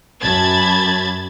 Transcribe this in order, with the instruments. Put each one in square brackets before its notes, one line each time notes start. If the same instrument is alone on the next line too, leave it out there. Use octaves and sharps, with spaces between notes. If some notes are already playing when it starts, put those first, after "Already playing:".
[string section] F#2 A5 B5 G#6 A6